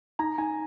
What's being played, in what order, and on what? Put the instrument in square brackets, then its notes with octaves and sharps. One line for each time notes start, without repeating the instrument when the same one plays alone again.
[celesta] D#4 [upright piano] A#5
[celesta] D#4 [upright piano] G#5